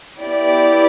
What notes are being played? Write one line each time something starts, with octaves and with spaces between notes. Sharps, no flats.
B3 E4 G4 D5